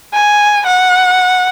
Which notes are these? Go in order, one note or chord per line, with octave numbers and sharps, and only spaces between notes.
G#5
F#5